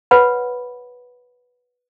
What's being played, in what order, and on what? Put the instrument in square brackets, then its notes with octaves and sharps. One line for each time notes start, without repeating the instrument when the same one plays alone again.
[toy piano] B4 C#5 F#5 B5